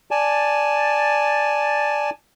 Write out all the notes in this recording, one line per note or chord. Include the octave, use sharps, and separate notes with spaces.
D5 G#5 A5